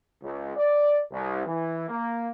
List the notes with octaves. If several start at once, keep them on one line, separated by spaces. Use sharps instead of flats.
C#2
D5
C2
E3
A#3